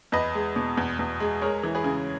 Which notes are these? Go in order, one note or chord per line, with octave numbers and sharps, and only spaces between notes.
E2 B4 D#5
G#3
B2
E2
E2
G#3
G#3 A#4 C#5
E3
G#4 B4
C#3